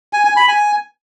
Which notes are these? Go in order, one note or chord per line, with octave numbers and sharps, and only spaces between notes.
G#5
G#5
B5
G#5